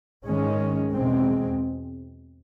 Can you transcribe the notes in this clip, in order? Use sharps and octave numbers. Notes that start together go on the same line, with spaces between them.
G#2 D#3 G#3 C#4
E2 B2 G#3 C4